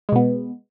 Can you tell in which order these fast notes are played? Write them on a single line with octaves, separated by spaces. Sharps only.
G#3 B2 B3